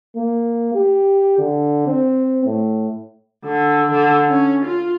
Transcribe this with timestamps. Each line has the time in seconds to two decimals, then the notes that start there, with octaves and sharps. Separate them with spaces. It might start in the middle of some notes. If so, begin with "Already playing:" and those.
0.16 A#3
0.75 G4
1.38 D3
1.87 C4
2.46 A2
3.45 D3
3.92 D3
4.28 C#4
4.65 F4